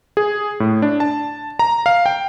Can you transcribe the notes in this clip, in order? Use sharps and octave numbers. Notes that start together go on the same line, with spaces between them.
G#4
A2
D4
A5
A#5
F5
G5